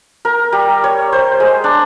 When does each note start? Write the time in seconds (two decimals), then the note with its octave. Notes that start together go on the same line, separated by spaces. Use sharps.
0.25 A#4
0.53 G3
0.84 C#5
1.12 C5
1.40 G#3
1.64 D4